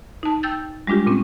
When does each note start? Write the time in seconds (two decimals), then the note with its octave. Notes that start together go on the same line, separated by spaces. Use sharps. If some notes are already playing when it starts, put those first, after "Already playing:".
0.23 D#4 A5
0.43 G5 E6 G6 A6
0.87 G3 G#3 D4 F4 G4
1.07 A#2 C4 C#4